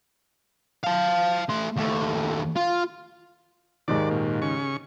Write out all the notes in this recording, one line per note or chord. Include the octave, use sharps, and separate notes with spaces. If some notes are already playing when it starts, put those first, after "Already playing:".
F5 A5
A3 C6
D#2 A3
F4
D#2 G#2 D#3 D5
A#2
C#3 C#6